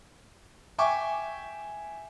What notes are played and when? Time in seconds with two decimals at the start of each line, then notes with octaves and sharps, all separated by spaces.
0.79 E5 G5 G#5 C#6 D6